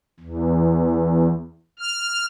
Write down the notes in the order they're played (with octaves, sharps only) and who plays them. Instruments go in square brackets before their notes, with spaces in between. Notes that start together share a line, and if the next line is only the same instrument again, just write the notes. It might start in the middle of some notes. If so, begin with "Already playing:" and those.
[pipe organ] E2
F6